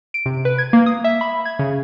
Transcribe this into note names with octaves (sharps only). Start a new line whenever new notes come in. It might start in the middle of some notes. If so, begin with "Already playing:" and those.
D7
C3
B4
G#6
A#3
D#6
E5
B5
G#6
C#3